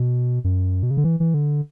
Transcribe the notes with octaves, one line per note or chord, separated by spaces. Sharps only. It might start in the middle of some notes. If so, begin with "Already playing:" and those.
Already playing: B2
F#2
B2
C#3
D3
E3
E3
D3